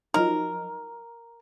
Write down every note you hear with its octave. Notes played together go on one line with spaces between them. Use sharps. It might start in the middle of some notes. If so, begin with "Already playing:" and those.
F3 F#3 D#4 A#4